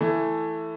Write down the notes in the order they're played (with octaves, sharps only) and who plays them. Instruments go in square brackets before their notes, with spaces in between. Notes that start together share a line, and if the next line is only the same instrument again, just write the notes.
[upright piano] E3 A3